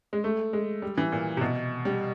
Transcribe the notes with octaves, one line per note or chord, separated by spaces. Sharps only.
G#3
A3
G#3
G3
E3
A#2
C3
B2
G3